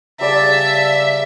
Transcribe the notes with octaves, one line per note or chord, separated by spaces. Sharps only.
C#3 G3 D5 E5 A5